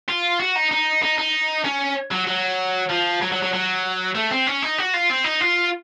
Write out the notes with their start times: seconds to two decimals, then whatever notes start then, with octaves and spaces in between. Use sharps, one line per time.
0.09 F4
0.40 F#4
0.56 D#4
0.71 D#4
1.03 D#4
1.18 D#4
1.65 C#4
2.12 F#3
2.28 F#3
2.90 F3
3.22 F#3
3.32 F#3
3.42 F#3
3.53 F#3
4.15 A3
4.31 C4
4.47 C#4
4.62 D#4
4.78 F#4
4.94 F4
5.10 C4
5.24 D#4
5.41 F4